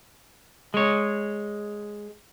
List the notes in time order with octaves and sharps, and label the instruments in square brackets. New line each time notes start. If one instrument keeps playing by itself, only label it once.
[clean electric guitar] G#3 C#5